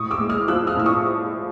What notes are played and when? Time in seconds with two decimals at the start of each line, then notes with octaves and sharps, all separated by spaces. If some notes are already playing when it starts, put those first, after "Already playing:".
Already playing: A2 C#6 D#6
0.11 D6 E6
0.20 G#3
0.29 D#6 F6
0.48 F3 E6 F#6
0.67 D#6 F6
0.76 A2 E6
0.86 C#6 D#6